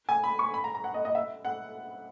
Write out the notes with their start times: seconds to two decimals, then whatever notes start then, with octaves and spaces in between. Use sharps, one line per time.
0.09 G#5
0.24 B5
0.39 C#6
0.54 B5
0.64 A#5
0.75 A#5
0.84 F#5
0.94 D#5
1.05 D#5
1.15 E5
1.45 F#5